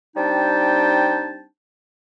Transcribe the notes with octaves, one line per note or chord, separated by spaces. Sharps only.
G3 C4 D4 D#4 G5 A5